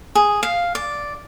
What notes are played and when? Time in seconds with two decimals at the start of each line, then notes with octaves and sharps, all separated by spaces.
0.15 G#4
0.43 F5
0.75 D5